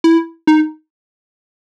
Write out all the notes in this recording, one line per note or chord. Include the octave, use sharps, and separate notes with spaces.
E4
D#4